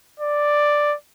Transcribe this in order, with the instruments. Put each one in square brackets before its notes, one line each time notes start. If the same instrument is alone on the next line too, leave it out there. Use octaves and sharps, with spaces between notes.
[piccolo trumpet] D5